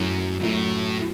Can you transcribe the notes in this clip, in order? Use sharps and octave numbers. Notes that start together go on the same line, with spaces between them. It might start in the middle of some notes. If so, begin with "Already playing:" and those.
Already playing: F#2 A2 F#3 A3 E4
F#2 A2 F#3 A3 E4